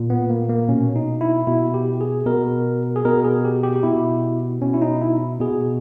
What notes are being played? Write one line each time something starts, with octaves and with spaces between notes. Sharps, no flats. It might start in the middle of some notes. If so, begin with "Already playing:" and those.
Already playing: A#2
B3
A#3
A#3
B2 C#4
D#4
E4
B2 E4
G4
G#4
B2 A#4
G#4
B2 A#4
G#4
G4
G4
G4
B2 E4
B2 C#4
E4
D#4
E4
B2 G#4